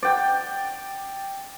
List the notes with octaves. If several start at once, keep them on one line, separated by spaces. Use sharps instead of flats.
D5 G5